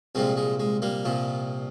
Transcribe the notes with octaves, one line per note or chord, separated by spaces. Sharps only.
C2 A#2 F3 G#3 C4
G#3
G#3
G3 A#3
C2 A#2 F3